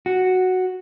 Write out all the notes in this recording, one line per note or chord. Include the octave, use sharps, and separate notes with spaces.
F#4